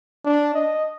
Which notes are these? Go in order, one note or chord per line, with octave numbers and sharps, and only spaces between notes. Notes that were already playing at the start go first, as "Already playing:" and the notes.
D4
D#5